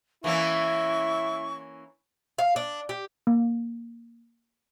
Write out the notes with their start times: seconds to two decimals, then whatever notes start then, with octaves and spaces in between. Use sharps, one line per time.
0.24 E3 A#3 C#4 E4 C#6
2.38 F5
2.56 D4
2.89 G4
3.27 A#3